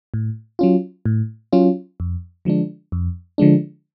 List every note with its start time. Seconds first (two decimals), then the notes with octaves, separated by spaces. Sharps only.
0.14 A2
0.59 F#3 C#4 F4
1.06 A2
1.53 F#3 C#4 F4
2.00 F2
2.45 D3 F3 G#3 D4
2.92 F2
3.38 D3 F3 G#3 D4